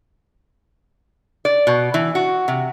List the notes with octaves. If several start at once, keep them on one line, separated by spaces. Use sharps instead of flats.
D5
B2
E3
F#4
C3